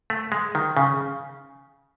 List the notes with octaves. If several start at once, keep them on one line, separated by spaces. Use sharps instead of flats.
A3
G#3
D#3
C#3